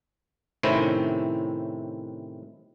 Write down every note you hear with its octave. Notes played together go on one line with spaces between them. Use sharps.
A2 C3 D#3 C4 C#4 E4